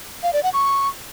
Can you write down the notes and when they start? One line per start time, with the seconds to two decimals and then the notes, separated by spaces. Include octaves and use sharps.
0.23 F5
0.33 D5
0.43 F#5
0.53 C#6